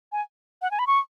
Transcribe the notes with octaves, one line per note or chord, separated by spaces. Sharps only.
G#5
F#5
G#5
B5
C#6